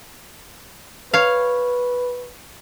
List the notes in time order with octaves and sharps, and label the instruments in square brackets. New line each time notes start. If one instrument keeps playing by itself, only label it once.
[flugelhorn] B4 [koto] C#5 F5